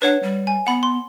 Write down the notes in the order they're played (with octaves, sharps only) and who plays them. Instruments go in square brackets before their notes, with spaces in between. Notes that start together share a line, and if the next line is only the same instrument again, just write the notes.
[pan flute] D4 [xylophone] B4 C#5 F#5
[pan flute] G3
[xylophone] G#5
[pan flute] B3 [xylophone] F#5 B5
[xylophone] C6